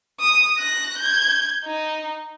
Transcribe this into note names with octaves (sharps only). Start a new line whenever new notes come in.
D#6
F#6 A#6
G6 G#6
D#4